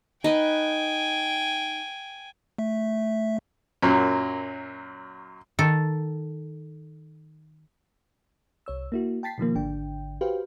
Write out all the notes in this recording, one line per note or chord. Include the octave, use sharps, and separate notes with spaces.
D#4 B4 D#5 G5 G#5
A3 E5
F#2 A#2 F#3
D#3 A4
C2 C#5 E6
A#3 E4 F#4
G5 A5 A6 B6 C7
B2 D#3 F3 A#3
G#1 D3 D4 G5
F#4 G4 B4 C5 F5 G5